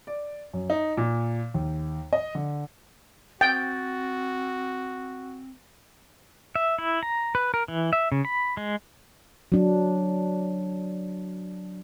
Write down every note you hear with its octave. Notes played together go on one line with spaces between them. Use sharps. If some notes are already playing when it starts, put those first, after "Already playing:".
D5
F#2
D#4
A#2
D#2
D#5
D3
C4 F#4 G5 A6
E5
E4
A#5
B4
A#4
E3
E5
C#3
B5
G#3
F#3 D4